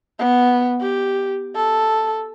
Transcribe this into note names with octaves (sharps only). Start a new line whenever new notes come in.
B3
G4
A4